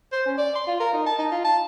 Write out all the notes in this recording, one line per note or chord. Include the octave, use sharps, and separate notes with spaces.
C5
C#4
D5
C6
F4
A#4
D#4
A5
D#4
F4
A5